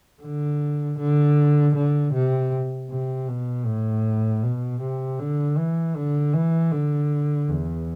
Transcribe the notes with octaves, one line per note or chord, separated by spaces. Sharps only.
D3
D3
D3
C3
C3
B2
A2
B2
C3
D3
E3
D3
E3
D3
E2